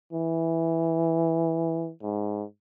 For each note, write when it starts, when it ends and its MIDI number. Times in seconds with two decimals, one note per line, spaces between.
0.13 1.91 52
2.02 2.44 44